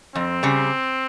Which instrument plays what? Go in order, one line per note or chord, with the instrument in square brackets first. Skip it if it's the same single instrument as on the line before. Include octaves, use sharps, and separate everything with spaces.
[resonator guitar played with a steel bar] F2 [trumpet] C4
[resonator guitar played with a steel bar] C#3 G3